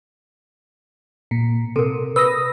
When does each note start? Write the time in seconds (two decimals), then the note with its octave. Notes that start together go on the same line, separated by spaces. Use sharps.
1.31 A#2
1.76 C3 A4 A#4
2.16 B4 D#6 E6 A#6